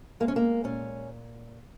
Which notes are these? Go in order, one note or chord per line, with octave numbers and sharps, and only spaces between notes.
G#3 A#3
C#4
A#3
A#2 C#4